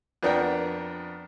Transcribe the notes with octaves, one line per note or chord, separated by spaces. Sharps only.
F2 B3 D4 A#4 F#5 G5